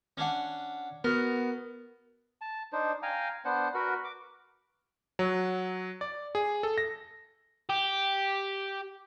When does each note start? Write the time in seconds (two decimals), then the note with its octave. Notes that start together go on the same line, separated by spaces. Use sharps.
0.17 C#4 D4 F#5
1.04 B3 F#4 A#4
2.41 A5
2.73 D4 D#4 C5
3.03 F5 G5 G#5 A#5
3.45 B3 D4 C5 F#5
3.75 F#4 A#4 B4 F#5
4.04 D6
5.19 F#3
6.01 D5
6.35 G#4
6.63 A4
6.78 A#6
7.70 G4